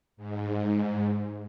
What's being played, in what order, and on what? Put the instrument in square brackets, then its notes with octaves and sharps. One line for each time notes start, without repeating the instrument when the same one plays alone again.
[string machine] G#2